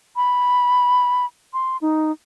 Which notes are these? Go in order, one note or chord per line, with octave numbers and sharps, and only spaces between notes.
B5
C6
D#4